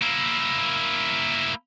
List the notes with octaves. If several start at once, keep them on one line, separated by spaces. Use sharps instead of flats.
A#3 E4